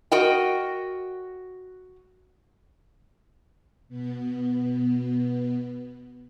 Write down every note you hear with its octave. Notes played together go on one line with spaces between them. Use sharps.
F#4 A#4 D#5 G5
B2 B3